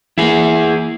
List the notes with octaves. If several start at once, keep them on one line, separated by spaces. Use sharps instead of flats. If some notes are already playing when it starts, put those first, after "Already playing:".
E3 A#3 E4 G#4